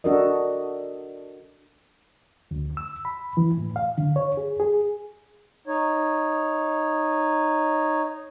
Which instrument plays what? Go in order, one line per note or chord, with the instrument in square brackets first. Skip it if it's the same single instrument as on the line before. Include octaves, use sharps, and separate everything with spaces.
[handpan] D4 F#4 A4 A#4 D#5
[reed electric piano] D2
E6
B5
E3
A2
F5
D3
C#5
G#4
G#4
[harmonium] D#4 C#5